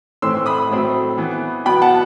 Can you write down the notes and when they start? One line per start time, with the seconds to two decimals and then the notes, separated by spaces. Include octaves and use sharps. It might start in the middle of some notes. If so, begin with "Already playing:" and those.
0.22 A2 E3 A3 C4 C6 E6
0.46 B5 D#6
0.70 A2 F#3 A3 C4
1.18 E3 B3
1.65 B2 F#3 B3 G5 B5
1.82 F#5 A5